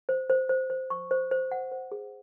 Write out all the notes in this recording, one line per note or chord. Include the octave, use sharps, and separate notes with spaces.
C5
C5
C5
C5
C#6
C5
C5
F#5
C5
G#4